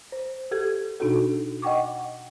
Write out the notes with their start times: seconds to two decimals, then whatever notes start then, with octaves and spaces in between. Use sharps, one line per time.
0.12 C5
0.51 G4 A4 G#6
1.00 B2 D4 D#4 F#4 A4
1.62 D#5 F#5 G5 C#6 D6